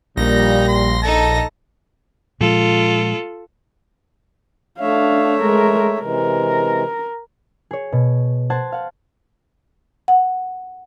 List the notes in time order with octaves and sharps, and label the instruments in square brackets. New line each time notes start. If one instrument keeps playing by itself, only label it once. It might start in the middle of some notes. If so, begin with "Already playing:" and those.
[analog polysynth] A#1 A#6 [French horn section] A#2 G3 A#3 [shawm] D#4
[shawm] C6
[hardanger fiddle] D#4 A4 [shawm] A5
[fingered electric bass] A#2 F3 G#3 [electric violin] F4 A4
[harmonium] A3 C#5 E5 [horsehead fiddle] D4 F5
[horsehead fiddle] G#3 A#4
[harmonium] C3 E3 G#3 [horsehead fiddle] A#4
[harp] G#4 C#5
B2
C5 F#5 A5 G#6
F5 F#5
[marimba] F#5